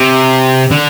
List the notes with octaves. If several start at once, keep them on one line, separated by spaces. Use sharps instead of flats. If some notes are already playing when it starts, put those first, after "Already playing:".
Already playing: C3
D3